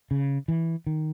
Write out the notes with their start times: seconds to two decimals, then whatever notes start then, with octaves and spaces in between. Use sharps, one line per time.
0.11 C#3
0.48 E3
0.87 D#3